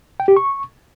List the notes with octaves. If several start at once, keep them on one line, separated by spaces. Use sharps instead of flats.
G5
G4
C#6